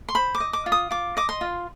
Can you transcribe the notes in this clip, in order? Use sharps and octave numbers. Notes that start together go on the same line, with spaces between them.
C6
C5 B5
D6
D#5
D6
F4
D#6
F4 D6
D#5 D6
C6
F4